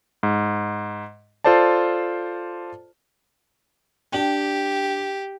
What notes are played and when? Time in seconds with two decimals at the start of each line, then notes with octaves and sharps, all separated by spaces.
0.23 G#2
1.44 F4 A4 C5 D5 A5
4.12 D4 G4 G5